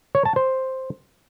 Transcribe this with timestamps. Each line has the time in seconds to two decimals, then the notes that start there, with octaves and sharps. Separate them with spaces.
0.15 C#5
0.25 A5
0.36 C5